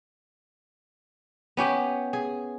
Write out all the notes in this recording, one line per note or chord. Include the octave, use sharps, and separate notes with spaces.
B3 C#4 G4
G#4